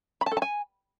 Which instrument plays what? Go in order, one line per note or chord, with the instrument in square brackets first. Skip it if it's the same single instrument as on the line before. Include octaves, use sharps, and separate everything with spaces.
[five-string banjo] B5
A5
A4
A5
G#5